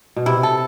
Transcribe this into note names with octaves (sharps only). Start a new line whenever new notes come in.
B2
C3 E4
A4